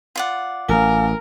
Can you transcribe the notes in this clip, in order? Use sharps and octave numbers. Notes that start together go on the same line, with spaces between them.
F4 D5 F#5
A1 A#4 F5 G#5